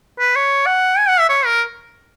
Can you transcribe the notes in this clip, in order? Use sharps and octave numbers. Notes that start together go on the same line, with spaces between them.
B4
C#5
F#5
G#5
F#5
E5
C#5
A#4